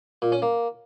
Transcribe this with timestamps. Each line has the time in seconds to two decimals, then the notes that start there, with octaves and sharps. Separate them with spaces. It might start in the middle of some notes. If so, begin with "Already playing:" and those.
0.22 A#2
0.32 C#4
0.42 A#3